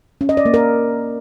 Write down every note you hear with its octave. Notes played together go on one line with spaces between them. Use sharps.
C#4
D#5
D5
A#3
A#4